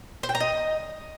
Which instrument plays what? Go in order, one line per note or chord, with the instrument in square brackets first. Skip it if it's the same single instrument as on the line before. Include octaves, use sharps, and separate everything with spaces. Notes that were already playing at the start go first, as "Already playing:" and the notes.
[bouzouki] C5
G5
A#5
D#5